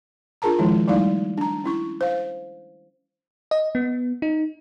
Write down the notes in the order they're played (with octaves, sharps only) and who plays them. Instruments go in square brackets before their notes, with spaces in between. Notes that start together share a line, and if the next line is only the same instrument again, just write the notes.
[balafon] D4 F4 G#4 A#4 A5 A#5
D#3 F3 G#3 E4
G3 A3 D#4 E4 D5 F5
D4 A#5
C#4 E4 C#6
C5 F5
[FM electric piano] D#5
B3
D#4